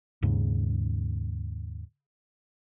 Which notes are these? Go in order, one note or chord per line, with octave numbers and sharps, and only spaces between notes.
D#2 G#2 C#3